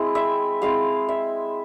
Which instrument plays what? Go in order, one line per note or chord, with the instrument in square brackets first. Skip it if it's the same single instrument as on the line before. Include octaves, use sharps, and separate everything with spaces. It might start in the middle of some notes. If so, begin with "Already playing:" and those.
Already playing: [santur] G#3 C4 E4
E5
G#3 C4 E4 F5
E5